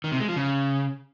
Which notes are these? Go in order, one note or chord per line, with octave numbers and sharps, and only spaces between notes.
D#3
C3
G#3
F3
C#3